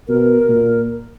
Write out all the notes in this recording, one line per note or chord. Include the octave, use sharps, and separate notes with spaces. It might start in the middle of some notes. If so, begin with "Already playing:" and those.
B2 A#4
A#2